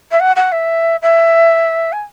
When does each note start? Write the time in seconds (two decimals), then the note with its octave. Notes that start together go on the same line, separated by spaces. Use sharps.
0.11 E5
0.20 F#5
0.36 F#5
0.52 E5
1.02 E5
1.92 G#5